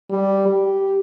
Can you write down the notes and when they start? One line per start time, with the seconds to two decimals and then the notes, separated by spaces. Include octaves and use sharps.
0.10 G3
0.48 G4